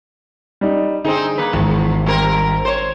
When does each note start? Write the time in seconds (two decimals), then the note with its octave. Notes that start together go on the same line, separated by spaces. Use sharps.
0.61 G3 D#4
1.04 D3 C4 D#4 G#4
1.38 A#3 B4
1.53 G#1 E2
2.06 G3 C4 A#4
2.65 C5 C#5